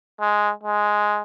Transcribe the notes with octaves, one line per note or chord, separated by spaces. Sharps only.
G#3
G#3